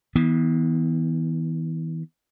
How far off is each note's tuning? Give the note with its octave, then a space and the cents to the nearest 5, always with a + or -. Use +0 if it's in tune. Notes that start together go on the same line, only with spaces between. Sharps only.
E3 -40 B3 -5